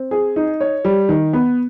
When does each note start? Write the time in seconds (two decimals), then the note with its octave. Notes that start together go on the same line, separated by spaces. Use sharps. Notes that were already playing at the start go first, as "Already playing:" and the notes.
Already playing: C4
0.11 G#4
0.36 D#4
0.60 C#5
0.85 G3
1.09 D#3
1.33 B3